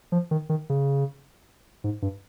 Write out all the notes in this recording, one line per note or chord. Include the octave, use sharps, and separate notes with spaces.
F3
D#3
D#3
C#3
G#2
G2